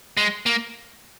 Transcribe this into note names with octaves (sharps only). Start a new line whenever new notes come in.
G#3
A#3